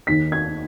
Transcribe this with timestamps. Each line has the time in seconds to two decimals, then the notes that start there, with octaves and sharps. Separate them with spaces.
0.07 D#2 D#3 B6
0.32 G#6